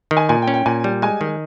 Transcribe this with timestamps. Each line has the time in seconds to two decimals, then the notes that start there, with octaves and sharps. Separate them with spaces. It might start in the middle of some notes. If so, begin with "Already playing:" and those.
0.11 D#3
0.17 G#5
0.29 A#2 G#5
0.42 G5
0.48 C#4
0.54 G5
0.66 A#2 G#5
0.84 G3
1.02 G#3 G#5
1.21 D#3